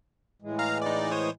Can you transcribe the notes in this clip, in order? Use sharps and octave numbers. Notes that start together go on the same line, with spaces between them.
A2 E3 G#3
F5 A#5 F6
D#4 D5
C5 C#5 D#6